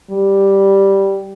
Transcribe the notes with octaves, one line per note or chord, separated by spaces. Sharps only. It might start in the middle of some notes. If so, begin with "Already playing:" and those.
G3